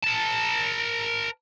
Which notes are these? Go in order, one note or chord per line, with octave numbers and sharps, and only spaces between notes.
A#4 A5